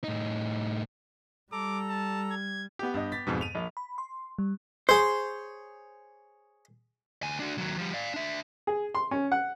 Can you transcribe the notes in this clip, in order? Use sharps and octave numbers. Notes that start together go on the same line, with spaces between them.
A2 D#4
G3 A4 A#5 D6
A5
G#6
B3 G4
G2 D#5
A6 B6
F2 G#2 B2
D#7 F7
A#1
B5
C6
G3
G#4 C5 C#5
D2 G#5
D4 F#4
D#2 F#3
F3 G3
D5 F5
D4 E5
G#4
C6
C#4
F#5